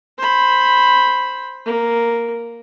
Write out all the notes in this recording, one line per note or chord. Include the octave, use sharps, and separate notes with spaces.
C5 B5
A#3